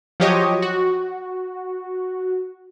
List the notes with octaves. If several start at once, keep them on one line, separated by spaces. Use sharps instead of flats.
F3 F#3 G4 C#5 D#5
F#4